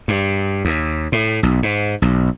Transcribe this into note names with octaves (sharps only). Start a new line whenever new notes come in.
G2
D#2
A2
B1
G#2
B1